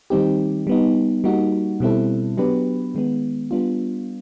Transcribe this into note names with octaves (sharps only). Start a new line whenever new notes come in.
D#3 G3 C4 D#4 G4
G3 B3 D#4
G3 A#3 D#4 F#4
B2 G3 C4 E4 A4
F#3 B3 D4 G4 B4
D#3 G#3 B3
G3 B3 D4 F4